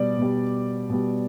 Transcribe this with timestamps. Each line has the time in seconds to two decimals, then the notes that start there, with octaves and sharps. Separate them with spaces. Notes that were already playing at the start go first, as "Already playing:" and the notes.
Already playing: B2 G3 D5
0.18 B2 G3
0.90 B2 G3